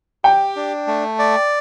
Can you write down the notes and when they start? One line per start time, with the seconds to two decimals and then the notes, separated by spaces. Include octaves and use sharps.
0.24 G4 G5
0.56 D4
0.87 A3
1.19 D5